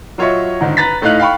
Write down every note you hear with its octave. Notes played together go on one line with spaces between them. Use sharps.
F#3 F4 C#5 D#5 E5 C#6
G#2 D3 D#3 D#4
B4 A#5 A6 B6
A2 A3 D#4 D#5 F5 F#6
F5 G5 B5 C#6